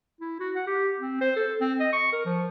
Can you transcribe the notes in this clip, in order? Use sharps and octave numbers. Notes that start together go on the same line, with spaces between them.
E4
F#4
F#5
G4
C4
C5
A4
C4
D#5
C#6
A#4
F3